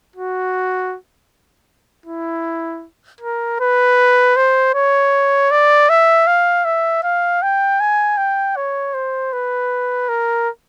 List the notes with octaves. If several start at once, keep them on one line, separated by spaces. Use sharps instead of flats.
F#4
E4
A#4
B4
C5
C#5
D5
E5
F5
E5
F5
G5
G#5
G5
C#5
C5
B4
A#4